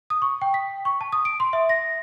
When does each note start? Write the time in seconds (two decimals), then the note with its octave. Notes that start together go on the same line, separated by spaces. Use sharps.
0.10 D#6
0.22 C#6
0.42 G5
0.54 B6
0.85 C#6
1.01 A5
1.13 D#6
1.25 D7
1.40 C6
1.53 E5
1.69 A#6